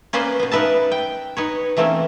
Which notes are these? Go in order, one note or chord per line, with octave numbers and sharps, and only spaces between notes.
A#3 C#4 B4 C5 D5 D#5
B2 B3
D#4 A#4 B4 E5 A5
G5
D#4 B4 C#5
E3 A3 A#3 C4 C#4